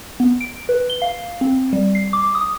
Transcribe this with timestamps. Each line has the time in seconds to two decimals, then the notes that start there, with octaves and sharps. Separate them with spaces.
0.20 B3
0.41 D7
0.69 B4
0.90 G7
1.02 F5
1.41 C4
1.73 G3
1.95 C7
2.13 D6
2.35 D#6